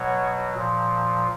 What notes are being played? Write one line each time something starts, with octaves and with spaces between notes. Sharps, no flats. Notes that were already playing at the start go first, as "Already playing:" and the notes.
Already playing: B2 F#3 C#5
A#2 F3